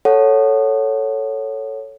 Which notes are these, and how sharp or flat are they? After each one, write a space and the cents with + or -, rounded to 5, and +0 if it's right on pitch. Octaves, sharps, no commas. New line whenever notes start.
A4 +0 C#5 +0 F#5 -5